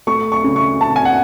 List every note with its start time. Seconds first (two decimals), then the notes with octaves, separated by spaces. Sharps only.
0.07 A3 C#6
0.32 C#6
0.44 C#3
0.56 C#6
0.81 C#3 A5
0.96 G#5
1.05 F#5